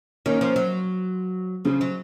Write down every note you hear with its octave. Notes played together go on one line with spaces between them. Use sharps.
D#3 A#3 C#4
F3
F#3
C#3 F3
F#3